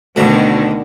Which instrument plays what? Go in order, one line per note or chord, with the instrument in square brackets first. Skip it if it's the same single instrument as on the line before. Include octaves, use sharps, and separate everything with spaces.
[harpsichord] D2 F#4 E5 [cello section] B2 D3 D#3